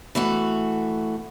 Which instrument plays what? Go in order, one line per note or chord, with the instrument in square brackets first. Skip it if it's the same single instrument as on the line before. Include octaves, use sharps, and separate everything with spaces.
[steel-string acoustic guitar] E3 A3 F#4